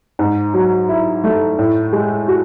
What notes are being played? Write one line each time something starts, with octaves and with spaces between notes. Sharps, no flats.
G#2
F#3
E4
A3
A2
G#3
F#4